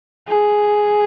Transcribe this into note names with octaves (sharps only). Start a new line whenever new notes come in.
G#4